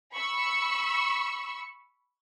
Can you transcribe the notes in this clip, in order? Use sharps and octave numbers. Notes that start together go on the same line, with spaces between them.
B5 C#6 E6